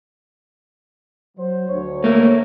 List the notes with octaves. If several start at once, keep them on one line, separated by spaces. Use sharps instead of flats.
F#3 C5
D2 C#5
A3 A#3